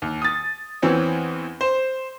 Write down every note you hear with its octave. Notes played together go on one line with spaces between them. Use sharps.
D#2
D#6 A6
E2 E3 C4 C#4
C5